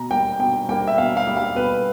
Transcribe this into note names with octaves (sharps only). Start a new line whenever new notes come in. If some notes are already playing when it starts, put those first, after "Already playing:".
Already playing: B2 A#5
G3 A#3 G5
B2 G5
G3 A#3 G5
E5
B2 F5
F5
G3 A#3
F5
B2 B4